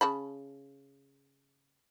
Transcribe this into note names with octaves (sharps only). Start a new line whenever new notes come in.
C#3 A5 B5